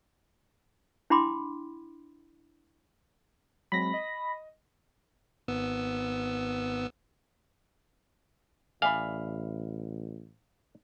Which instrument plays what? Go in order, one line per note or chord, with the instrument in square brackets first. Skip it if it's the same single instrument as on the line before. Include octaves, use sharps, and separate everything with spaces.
[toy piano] D4 E4 G5 B5 C6 D6
[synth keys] F#3 G#3 C4 [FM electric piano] B5 A#6
[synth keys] D#5
[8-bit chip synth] G#1 B3 E6
[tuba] A1 [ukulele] D5 E5 B5 [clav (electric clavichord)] F5 [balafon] G#5